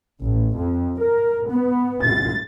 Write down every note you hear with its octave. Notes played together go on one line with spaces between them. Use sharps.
A1
F2
A#4
B3
A6